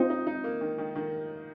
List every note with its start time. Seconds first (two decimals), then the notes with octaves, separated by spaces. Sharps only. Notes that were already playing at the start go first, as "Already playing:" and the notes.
Already playing: C4 D#4 F4
0.10 D#4
0.27 D#4
0.44 A#3
0.61 D#3
0.78 D#3
0.96 D#3